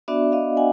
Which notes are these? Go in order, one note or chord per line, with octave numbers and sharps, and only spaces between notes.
B3 D4 F#4 D5 E5
D#5 F5
F#5 G#5